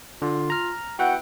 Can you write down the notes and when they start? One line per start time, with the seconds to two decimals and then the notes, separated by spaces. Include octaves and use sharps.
0.22 D3 F4
0.50 A#5 F6
0.99 B3 E4 F#4 F#5 G5